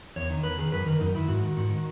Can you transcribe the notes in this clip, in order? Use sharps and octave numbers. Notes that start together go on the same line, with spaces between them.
E2 C#5
D#3
E2 B4
D#3 G#4
F#2 B4
D#3 A#4
F#2 D#4
D#3 E4
G#2 F#4
D#3
G#2 F#4
D#3